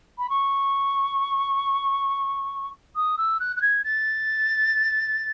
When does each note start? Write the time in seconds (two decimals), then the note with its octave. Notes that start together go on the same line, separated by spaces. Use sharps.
0.18 B5
0.30 C#6
2.96 D#6
3.18 E6
3.40 F#6
3.56 F#6
3.62 G#6
3.84 A6